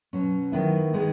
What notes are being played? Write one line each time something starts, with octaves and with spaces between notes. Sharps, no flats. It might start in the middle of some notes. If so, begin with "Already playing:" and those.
B2 F#3 C#4
D#3 F#3 B3 E4
D#3 G#3 B3 D#4